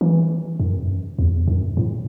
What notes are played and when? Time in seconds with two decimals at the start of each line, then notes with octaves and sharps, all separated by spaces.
0.01 E3
0.60 F#2
1.19 E2
1.48 F#2
1.77 A2